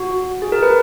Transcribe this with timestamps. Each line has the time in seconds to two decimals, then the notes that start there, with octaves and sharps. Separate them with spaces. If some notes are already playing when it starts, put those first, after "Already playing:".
Already playing: F#4
0.42 G#4
0.52 A#4
0.63 B4